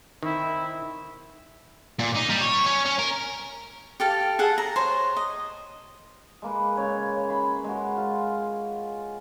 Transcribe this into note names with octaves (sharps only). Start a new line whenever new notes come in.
D#3 C4 E4
A#2
D#4
G3
C#5
C#4
C#4
A#4
G4 A4 F5
G#4 A4 F#5 A5
A#5
C5 C#5
D#5
G#3 A#3 B4
C#3 C#5
B5 C6
G#3 F#4
F4